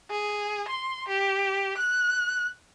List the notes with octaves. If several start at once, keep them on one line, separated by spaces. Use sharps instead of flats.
G#4
C6
G4
F#6